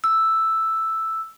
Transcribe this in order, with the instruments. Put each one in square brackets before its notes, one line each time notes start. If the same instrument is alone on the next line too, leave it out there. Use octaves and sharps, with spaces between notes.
[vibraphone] E6